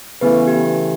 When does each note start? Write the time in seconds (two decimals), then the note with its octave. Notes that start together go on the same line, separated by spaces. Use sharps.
0.21 C#3 E3 A3 B3 B4
0.48 G4